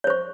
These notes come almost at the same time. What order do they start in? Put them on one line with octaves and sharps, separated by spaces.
C#5 C5 C#6